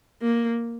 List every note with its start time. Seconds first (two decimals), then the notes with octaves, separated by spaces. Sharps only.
0.22 A#3